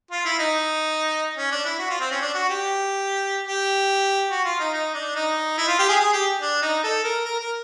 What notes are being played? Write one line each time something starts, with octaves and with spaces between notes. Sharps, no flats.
F4
E4
D#4
C#4
D4
E4
F#4
F4
C4
C#4
D4
F#4
G4
G4
F#4
F4
D#4
D#4
D4
D#4
E4
F4
G4
G#4
G#4
G4
D4
D#4
A4
A#4
A#4
A#4